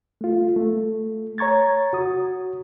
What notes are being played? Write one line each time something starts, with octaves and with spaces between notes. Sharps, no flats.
A3 F4
A3
C#5 A#5 C#6 G#6 A6
F#4 D#6